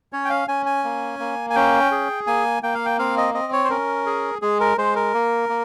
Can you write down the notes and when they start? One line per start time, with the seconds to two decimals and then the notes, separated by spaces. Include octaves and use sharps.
0.13 C#4 C#5
0.25 G5
0.30 F5
0.48 C#4 G#5
0.66 G#5
0.84 A#3
1.19 A#3
1.50 G#5
1.55 C#4 G5
1.91 G#4
2.27 A#3 G#5
2.63 A#3 G5
2.75 F5
2.85 G5
2.99 C4 F5
3.17 D#5
3.34 C4 D#5
3.53 C#5
3.64 C5
3.70 C#4 A#4
4.06 G#4
4.42 G#3 G#4
4.60 A#4
4.78 G#3 C5
4.96 A#4
5.14 A#3
5.49 A#3